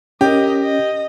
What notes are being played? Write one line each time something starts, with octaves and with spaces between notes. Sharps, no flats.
C#4 G4 A#4 D#5
D#5